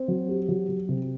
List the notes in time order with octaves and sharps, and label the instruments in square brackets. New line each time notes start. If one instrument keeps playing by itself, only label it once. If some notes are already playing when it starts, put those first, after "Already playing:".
Already playing: [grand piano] C4
F#3
G4
F#3
F#3
C3